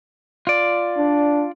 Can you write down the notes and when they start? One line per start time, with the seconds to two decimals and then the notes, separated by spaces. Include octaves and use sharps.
0.47 F4 D5
0.97 D4